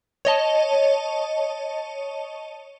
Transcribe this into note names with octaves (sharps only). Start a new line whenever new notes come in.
C#5 D#5 A5